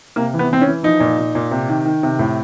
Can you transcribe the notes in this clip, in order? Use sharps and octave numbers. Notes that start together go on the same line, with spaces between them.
C3 A#3
E3
B3
E3 C4
C#4
E3
F3 D#4
A#2
A#2
A#2
C3
D#3
D#3
C3
A2